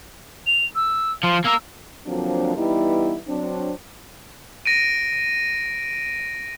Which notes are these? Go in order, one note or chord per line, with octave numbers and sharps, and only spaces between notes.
F7
E6
F3 C6
A#3 A#4 E6
D3 F3 F#3 A#3 C4 D4
E3 G3 B3 D#4 E4
F#3 C4 D4
A#6 D7 D#7